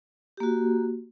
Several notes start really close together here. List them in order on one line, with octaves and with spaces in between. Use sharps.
G4 A#3 F#4